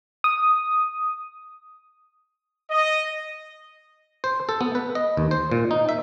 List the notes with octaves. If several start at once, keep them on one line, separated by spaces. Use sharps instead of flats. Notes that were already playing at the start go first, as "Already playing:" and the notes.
D#6
D#5
C5
A4
B3
B4
D#5
D#2
C5
A#2
D#4
E5